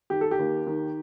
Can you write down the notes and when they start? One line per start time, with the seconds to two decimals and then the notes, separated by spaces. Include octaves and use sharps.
0.10 D#3 G4
0.21 A4
0.31 G4
0.39 D#2
0.67 D#3